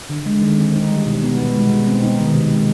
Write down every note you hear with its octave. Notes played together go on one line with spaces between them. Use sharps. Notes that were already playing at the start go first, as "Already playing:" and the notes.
D3
G#3
D#3
C4
D#4
G3
B2
B3
B2
G#3
B2
C4
D#4
D#3
C3
G#3